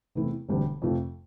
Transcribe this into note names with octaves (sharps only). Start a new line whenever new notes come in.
E2 C3 E3 A3 E4
E1 D2 D3 G3
F2 C3 F3 A3